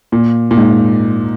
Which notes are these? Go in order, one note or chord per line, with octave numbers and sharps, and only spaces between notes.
A#2
A#2
G#2